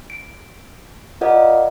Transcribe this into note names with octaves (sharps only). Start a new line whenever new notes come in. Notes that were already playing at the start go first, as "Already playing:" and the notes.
D7
F4 A#4 D5 D#5 F5 F#5